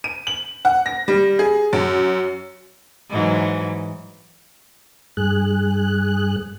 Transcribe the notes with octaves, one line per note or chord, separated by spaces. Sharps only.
D#7
F#7
F#5
A#6
G3
G#4
F#2
G#2 E3 F#3
G2 G#4 F#6